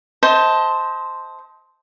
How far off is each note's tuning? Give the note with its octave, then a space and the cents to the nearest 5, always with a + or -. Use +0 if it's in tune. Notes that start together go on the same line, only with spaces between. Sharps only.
C5 +0 D#5 +35 A5 +0